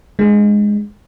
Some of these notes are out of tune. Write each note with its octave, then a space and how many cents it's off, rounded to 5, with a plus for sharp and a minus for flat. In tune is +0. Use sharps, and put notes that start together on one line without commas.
G#3 +0 D4 +30